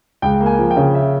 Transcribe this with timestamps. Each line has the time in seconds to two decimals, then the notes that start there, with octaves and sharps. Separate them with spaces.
0.22 C#2 G5
0.40 A#3
0.46 G#5
0.59 F3
0.71 G5
0.77 C#3
0.95 E5